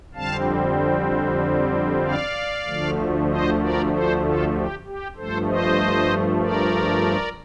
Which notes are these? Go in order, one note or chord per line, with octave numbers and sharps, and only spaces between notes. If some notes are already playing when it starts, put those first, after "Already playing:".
F2 D3 G3 C4 F5 A5
D5 F5
D2 D3 F3 A3
C5 D#5
A#4 D5
A4 C5
F4 A4
G4
G4
G2 F3 A3 A4 C5
C5 D#5
A#4 D5